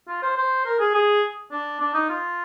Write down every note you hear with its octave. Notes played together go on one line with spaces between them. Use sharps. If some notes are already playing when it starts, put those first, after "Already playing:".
F4
C5
C5
A#4
G#4
G#4
D4
D4
D#4
F4